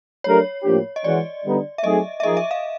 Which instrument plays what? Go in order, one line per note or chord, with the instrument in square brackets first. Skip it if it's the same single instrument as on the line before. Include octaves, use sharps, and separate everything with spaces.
[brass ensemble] F#3 A3 D4 G4 A#4 [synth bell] C#5
[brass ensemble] A2 F3 A#3 D4 G4
[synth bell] D#5
[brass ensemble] E3 G#3 C#4 F#4 [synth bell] D5
[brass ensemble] D3 G3 B3 D#4
[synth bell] E5
[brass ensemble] F#3 A3 C4 D#4 G#4 [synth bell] D#5
[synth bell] E5
[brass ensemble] F3 A#3 D#4 G#4 [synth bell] D#5
[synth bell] E5
F5